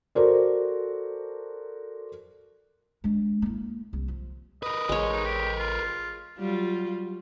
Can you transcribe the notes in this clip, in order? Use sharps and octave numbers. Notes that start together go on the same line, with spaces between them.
F#4 A4 A#4 C5 D5
G#3 D4
A#3 E4
C2
F3
A#4 B4 D#5
A1 G#3 C#5
D#4
G4
F4
F#3 G3 F4